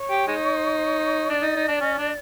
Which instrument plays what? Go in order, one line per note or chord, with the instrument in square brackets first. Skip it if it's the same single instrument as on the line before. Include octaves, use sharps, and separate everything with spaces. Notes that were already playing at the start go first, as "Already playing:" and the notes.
Already playing: [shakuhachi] C#5
[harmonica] G4
G#3 D#4
[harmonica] D4 [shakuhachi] D5
[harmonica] D#4
D#4
D4
C#4
D4